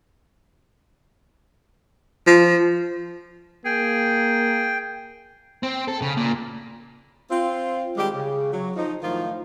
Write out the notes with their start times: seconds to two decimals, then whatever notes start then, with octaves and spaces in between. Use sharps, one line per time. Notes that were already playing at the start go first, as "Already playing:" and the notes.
2.27 F3
3.65 A#3 G#4 G5
5.63 C4
5.88 A4
6.02 C#3
6.17 A#2
7.30 C4 F4
7.97 D#3 G3 G#3 G4
8.15 C#3
8.53 F#3
8.76 F3 D#4
9.02 A2 D#3 F3 F#3 F4